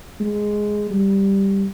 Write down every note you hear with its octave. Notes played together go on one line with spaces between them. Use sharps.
G#3
G3